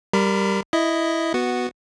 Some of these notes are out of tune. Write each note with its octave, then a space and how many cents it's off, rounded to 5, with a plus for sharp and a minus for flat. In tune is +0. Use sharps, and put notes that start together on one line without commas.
G3 +0 A#4 +0 B5 +35
E4 +0 D#5 +0
B3 +0 F#4 -5